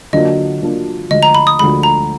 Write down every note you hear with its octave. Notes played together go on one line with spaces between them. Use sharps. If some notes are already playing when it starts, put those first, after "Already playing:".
D3 F#3 A#3 D4 F4 D#5
D3 F#3 A#3 D4 F4
D2 D3 F3 G#3 D#5
A#5
B5
D#6
D2 D3 F3 G#3 B5
A#5